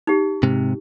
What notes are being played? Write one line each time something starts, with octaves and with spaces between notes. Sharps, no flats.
D#4 G4
G#2 C3